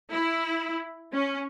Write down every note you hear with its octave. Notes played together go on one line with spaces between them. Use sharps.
E4
C#4